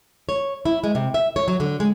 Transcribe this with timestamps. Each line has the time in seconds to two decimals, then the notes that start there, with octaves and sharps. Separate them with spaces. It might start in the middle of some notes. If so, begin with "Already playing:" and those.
0.29 C#5
0.65 E4
0.83 G#3
0.95 C3
1.14 E5
1.36 C#5
1.48 F#3
1.60 D3
1.80 G#3